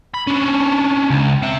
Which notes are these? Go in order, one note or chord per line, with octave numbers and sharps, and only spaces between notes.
B5
C#4 D4
C#2
C4 E5